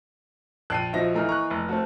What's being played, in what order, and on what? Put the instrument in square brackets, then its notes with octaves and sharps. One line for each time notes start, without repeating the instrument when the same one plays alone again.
[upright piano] A#1 [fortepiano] G5 A5 [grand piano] F#6 C7 D#7
[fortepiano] F3 D#4 F#4 [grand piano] E5 A#6
[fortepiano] E3 A#3 D#4 [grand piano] A3 A#5 F6
[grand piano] A#5 [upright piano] C#6 F#6
[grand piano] F1
[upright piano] A3 C4 [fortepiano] F#4